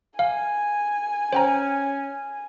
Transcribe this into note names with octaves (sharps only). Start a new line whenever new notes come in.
F5 G#5
C#4 C5 G5 A#5